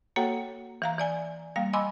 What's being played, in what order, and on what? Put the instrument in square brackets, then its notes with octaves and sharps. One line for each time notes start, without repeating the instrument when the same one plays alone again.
[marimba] A#3 F#4 A4 C#5 F#5 G5
E3 F5 A#5
E3 D5 G#5
G3 A#3 F5
D#5 G#5 B5 C6 D6 E6